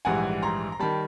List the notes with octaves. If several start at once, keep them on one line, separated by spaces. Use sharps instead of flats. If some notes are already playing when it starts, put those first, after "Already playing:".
A#1 G#2 E3 G3 F#5 G#5
A#5 C6
A#5
D#3 G3 A5 B5